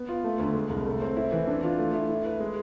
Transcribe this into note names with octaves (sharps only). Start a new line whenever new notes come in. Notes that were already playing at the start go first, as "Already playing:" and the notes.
Already playing: B3
F4
A3
D2
G#3
C2
A3
C4
E4
E3
D4
F4
A3
E4
E4
B4
G#3